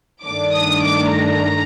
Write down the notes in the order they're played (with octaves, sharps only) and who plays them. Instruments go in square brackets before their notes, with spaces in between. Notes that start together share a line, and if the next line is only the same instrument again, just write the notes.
[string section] G2 D#3 A3 D4 D6
D#6
D6
A#5